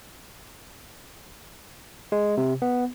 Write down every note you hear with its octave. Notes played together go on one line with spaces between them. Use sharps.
G#3
C3
B3